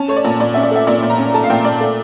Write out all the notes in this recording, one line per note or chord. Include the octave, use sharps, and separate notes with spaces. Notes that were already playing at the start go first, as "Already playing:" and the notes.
Already playing: C#4 A5
A3 C#5
D5
A#2
A#2 D5
C#4 E5
D5
A3 E5
A#2 D5
A#2
A#5
C#4
A3 A5
F5
A#2 G5
A#2 D5
A3